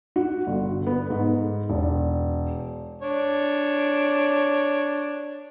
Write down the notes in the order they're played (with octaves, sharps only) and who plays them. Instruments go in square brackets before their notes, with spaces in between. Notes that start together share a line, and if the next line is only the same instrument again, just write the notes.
[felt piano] F#4
G1
B3
G#2
E1
[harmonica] D4 C#5